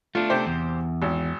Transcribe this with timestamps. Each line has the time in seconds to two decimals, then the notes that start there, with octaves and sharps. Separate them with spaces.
0.15 A3 D4 F4
0.30 C3 G4 C5
0.46 E2
1.02 G#1